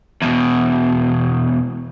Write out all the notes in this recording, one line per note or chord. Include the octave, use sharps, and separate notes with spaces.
E2 B2